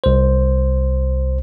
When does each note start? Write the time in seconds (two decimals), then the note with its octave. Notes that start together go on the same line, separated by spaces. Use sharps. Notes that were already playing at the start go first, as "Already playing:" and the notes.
0.04 C2 C5